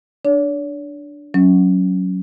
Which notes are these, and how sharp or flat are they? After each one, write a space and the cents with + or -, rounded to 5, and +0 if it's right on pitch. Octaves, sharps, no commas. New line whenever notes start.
D4 +0 C#5 +45
F#3 +0 C#4 +0